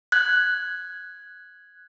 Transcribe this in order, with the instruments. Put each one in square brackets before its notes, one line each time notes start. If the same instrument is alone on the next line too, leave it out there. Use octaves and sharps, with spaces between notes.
[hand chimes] F#6 G#6